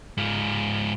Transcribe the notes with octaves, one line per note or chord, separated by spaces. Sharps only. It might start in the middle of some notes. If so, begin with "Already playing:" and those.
G#2 F4